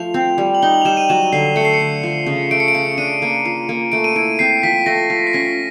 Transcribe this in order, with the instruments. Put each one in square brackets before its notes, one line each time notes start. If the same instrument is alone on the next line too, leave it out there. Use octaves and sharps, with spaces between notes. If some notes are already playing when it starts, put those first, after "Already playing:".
Already playing: [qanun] F3 A3 [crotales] F7
[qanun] C4
G3
[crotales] F#7
[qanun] D#4 [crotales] G7
[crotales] F#7
F7
[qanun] G3 [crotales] E7
[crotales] D#7
[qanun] F#3 [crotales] E7
[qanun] D3 [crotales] C7
[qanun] A3 [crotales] C#7
[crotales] C7
C#7
[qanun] D3
F3
C#3
[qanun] A3 [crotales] D7
[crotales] C#7
D7
[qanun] C#3
[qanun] D4 [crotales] D#7
[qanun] A#3
F4
A#3
[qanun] A3 [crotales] D7
[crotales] D#7
[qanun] E4 [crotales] D7
[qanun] C4 [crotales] C7
[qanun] F3 [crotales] B6
[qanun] A3 [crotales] A#6
[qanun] F4
[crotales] C7
[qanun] C#4 [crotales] B6